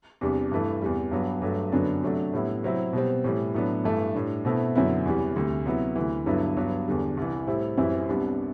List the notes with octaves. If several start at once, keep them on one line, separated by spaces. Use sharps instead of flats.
E2 C3 G3 D4
G2 E3 A3
E2 C3 G3
G2 F#3 B3
G2 F#3 A3
F#2 D3 F#3 B3 D4
C3 F#3 A3 D4
A2 G3 B3 E4
C3 F#3 C4 E4
B2 G3 C4
A2 E3 G3
A2 F#3 B3 D4
G2 E3 A3
A2 G3 D4
B2 A3 C4 E4
F#2 D3 F#3 B3 E4
E2 C3 E3 G3
D2 C3 G3
C3 F#3 B3 E4
D2 C3 E3
G2 D3 F#3 B3 E4
G2 F#3 B3
E2 D3 G3
C2 C3 E3
A2 G3 C4 E4
F#2 E3 G3 C4 E4
C2 C3 G3 B3 D4